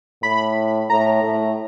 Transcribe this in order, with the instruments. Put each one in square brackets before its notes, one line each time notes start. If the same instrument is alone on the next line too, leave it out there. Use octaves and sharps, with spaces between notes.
[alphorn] A2 [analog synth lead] B5
[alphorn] A2 [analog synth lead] A#5
[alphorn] A2